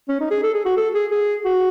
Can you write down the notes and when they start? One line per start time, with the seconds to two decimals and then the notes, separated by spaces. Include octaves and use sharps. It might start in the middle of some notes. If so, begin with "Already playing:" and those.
0.08 C#4
0.20 D#4
0.31 G#4
0.43 A4
0.54 G#4
0.65 F#4
0.77 A4
0.94 G#4
1.11 G#4
1.45 F#4